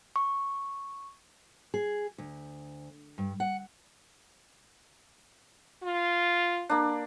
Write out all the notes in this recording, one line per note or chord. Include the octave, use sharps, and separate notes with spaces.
C#6
G#4
D2
G2
F#5
F4
A#3 D4